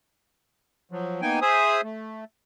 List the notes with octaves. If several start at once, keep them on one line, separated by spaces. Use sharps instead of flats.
F3 F#3
A#3 B3 D#4 G5 G#5
G#4 C5 E5 G#5 D#6
A3